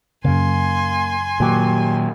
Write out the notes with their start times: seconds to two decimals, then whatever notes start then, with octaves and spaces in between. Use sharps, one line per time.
0.24 F#2 C#3 A#3 G#5 C6
1.40 A#2 D#3 F#3 A#3 G4